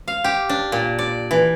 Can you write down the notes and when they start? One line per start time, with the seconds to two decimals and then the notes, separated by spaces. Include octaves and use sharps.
0.08 F5
0.24 G4
0.49 D4
0.72 A#2
0.99 D5
1.31 E3